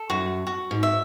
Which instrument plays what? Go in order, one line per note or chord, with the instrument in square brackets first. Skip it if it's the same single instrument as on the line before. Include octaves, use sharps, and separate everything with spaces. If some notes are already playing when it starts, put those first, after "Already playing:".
Already playing: [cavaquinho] A4
[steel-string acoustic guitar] F#2 [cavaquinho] F#4
[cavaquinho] F#4
[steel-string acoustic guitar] G#2
[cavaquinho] E5